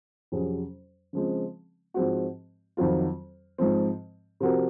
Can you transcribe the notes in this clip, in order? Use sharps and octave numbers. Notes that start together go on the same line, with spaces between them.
F2 C3 F#3 C#4 G#4
C#3 F3 G#3 C4
G#2 F3 G#3 C4 F#4
F2 D#3 F#3 C4 F4
G#2 F3 C4
C3 F3 C4 F#4 A#4